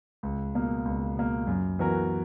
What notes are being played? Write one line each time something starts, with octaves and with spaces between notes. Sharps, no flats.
C#2
B2 A#3
C#2
B2 A#3
F#2
E3 B3 F#4 A#4